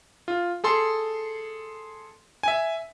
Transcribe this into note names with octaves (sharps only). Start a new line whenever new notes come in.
F4
G#4 A4 C6
E5 G#5